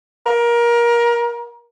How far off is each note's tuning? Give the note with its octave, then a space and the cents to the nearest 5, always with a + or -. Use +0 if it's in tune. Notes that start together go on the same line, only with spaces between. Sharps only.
A#4 +25